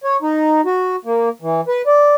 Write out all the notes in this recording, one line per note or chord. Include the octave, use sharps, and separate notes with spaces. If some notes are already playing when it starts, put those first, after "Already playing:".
C#5
D#4
F#4
A#3
E3
B4
D5